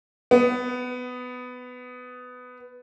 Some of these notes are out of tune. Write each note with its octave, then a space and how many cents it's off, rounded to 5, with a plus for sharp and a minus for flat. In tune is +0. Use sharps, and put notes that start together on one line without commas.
B3 +15